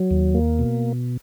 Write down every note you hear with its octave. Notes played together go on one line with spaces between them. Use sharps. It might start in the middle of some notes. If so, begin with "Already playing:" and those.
Already playing: F#3
D#2
A#3
B2